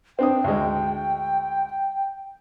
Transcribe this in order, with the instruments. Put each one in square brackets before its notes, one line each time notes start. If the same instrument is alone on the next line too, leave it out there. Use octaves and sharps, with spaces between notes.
[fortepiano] C4 D4 D#6 [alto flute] G5
[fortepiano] D2 G#3